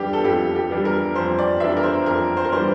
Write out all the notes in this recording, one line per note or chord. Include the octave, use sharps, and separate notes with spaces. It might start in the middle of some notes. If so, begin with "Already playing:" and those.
Already playing: F2 E3 G3 D4 G4
A4
F2 G4
G4
E3 G3 D4
A#4
F2 C5
D5
E3 G3 D4 E5
A#4
C5
F2 A#4
C5
A#4
E3 G3 D4 C5